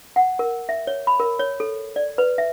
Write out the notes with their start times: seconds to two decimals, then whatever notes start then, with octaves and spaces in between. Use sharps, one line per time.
0.16 F#5
0.39 A#4
0.69 E5
0.87 C#5
1.07 B5
1.20 A#4
1.39 C#5
1.60 A4
1.96 D5
2.18 B4
2.38 E5